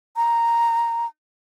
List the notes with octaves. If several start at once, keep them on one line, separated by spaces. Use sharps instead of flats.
A#5